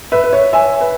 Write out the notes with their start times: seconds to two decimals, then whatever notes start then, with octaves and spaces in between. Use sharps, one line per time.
0.12 B4 E5
0.24 B4
0.33 C#5
0.53 E5 G#5
0.81 B4